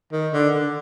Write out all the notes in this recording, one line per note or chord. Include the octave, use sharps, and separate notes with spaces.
D#3
D3
D3